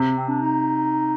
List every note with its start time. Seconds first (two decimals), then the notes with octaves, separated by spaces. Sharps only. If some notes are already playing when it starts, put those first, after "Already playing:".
Already playing: C3
0.16 C4
0.28 D4
0.42 D#4